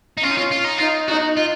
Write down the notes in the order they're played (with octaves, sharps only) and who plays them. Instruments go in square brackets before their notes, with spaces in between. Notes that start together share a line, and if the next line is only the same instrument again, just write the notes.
[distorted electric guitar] D#4
[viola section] C#4 [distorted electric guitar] F4
[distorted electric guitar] D#4
F4
F4
D#4
[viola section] D#4 [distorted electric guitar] F4
[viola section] D#4 [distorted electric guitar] F#4
[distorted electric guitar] F4